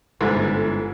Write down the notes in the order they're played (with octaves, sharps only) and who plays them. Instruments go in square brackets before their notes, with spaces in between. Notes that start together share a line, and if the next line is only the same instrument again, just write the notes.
[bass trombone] G1 [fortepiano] G#2 C3 E3 [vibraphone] A4